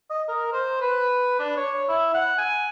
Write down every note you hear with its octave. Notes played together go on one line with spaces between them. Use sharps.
D#5
A#4
C5
B4
D4
C#5
E4
F#5
G#5